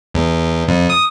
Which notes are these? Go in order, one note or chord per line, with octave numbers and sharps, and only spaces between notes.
E2
F2
D#6